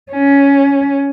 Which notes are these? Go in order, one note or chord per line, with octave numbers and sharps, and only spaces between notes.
C#4